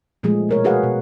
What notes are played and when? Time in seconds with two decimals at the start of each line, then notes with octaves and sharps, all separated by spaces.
0.23 A#2 F3 G#3 A3 G#4
0.49 B2 A#4 C#5
0.64 F#4 G#4 B4 F5 F#5
0.83 B2